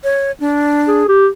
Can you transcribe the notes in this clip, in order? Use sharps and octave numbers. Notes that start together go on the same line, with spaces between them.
C#5
D4
G#4
G4